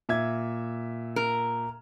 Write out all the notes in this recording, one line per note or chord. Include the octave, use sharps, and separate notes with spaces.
A#2 E5 G#6
A#4